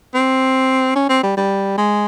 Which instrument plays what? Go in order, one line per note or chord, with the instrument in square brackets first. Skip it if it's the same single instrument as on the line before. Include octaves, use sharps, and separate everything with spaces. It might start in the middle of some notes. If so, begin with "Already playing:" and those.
[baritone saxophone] C4
C#4
C4
G3
G3
G#3